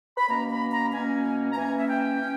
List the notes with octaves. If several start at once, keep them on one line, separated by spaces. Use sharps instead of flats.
B5
B2 A#3 C#4 A#5
B5
A#5
B2 A#3 C#4 G#5
A#5
E3 A#3 C#4 G#5
E5
G5
C#4